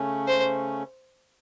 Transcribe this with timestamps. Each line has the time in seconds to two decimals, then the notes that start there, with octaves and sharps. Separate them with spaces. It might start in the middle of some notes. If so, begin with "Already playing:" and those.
Already playing: C#3 A3 C#4
0.28 C5